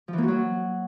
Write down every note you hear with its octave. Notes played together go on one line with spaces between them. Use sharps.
F3
E3
A#3
F#4
F#3